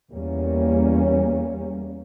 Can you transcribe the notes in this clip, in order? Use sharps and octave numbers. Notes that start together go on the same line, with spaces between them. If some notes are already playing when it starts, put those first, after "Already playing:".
E2 G3 A#3 C#4